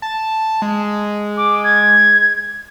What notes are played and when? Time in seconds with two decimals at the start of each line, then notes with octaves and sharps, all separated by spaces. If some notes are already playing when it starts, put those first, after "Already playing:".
0.02 A5
0.62 G#3
1.37 D6
1.64 G#6